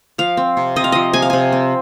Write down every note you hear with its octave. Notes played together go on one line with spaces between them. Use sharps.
F3 F5
C4
C3
C4 D#5
F5
F3 D#5
C3 G#5
F5
C3 G#5
C4